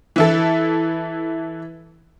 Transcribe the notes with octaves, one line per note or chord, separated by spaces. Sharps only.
E3 E4 A4